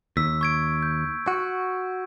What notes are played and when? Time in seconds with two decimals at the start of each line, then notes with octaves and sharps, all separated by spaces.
0.17 D#2 E6 B6
0.41 C#6 G#6 D7
0.83 G6
1.28 F#4